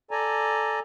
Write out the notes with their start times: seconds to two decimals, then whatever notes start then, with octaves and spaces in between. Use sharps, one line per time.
0.11 A4 D5 G#5 A#5